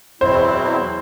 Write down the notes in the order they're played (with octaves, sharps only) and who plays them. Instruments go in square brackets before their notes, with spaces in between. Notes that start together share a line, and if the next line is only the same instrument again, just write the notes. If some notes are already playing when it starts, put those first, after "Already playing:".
[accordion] E2 B2 F#3 C4 E4 [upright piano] C5